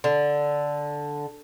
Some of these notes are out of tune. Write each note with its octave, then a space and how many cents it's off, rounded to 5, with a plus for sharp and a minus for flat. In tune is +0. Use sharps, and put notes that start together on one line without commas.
D3 -5